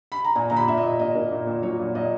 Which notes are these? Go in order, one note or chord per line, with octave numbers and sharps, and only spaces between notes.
B5
A#5
A#2 G#5
A#2 A#5
B5
A#2 E5
D#5
A#2
A#2 D#5
A#3
A#2
A#2
F#3 C#5
A#2
A#2 D#5